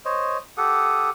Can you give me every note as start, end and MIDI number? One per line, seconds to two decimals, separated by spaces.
0.05 0.38 72
0.05 0.38 73
0.05 0.38 75
0.57 1.10 67
0.57 1.10 69
0.57 1.10 78
0.57 1.10 87